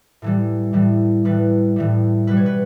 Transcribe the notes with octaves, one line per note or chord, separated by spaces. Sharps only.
A2 E3 G3
A2 E3 G3
A2 E3 G3 B4
A2 E3 G3
B2 G3 B4
C#5
B4